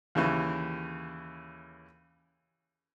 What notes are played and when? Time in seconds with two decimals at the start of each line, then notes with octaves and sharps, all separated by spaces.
0.15 D#2 C#3 E3